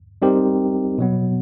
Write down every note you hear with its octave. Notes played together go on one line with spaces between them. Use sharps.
G3 C4 D#4 G4 A#4
B2 F#3 B3